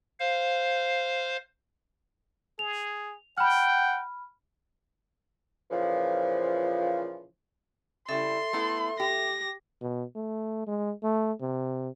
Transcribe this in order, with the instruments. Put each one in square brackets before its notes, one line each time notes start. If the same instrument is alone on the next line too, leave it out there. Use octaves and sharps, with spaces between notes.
[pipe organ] C5 F5
[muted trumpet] G#4 [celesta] F7
[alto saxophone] F#5 [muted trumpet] G5 [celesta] B5 F6
[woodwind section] A#2 C#3 E3 F3
[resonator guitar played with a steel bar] C#3 G3 E4 [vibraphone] A4 E5 [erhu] C6
[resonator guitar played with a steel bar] A3 B3 E4
[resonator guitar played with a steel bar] G4 [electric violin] A#6
[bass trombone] B2
A3
G#3
A3
C3